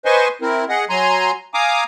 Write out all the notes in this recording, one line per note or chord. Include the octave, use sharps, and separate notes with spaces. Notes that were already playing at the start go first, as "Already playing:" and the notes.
B4 C5 D#5 G#5 C6 C#6
C4 E4 A#4
G#4 D#5 F#5
F#3 G#5 A#5 C6
F5 G#5 A#5 D6 D#6